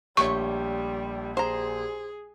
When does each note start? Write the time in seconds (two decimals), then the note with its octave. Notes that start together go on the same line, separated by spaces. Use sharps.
0.17 A#1 A#2 G3 A3 G4 C#5 C#6
1.37 G#4 C5 A#5